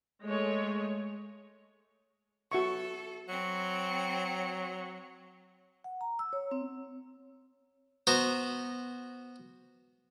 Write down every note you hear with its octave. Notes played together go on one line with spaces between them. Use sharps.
G#3 A3 C#5
F#4 A4 E5 C#6
F#3 C4 C#7
F#5
A#5
E6
C#5
C4
B3 F#4 C5 A#5